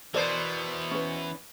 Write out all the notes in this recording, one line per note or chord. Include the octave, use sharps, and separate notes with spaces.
B2 E3 B3 A#4 C5 D5
C#4 B4